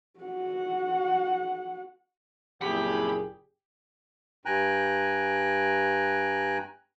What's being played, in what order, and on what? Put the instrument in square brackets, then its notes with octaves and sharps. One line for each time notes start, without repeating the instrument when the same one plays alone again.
[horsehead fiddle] F#4 F#5
[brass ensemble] F#1 A#2 G#4 [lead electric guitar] F2 E4 [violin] G4 [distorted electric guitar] B5
[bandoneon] G2 G5 G#5 A#5 F#6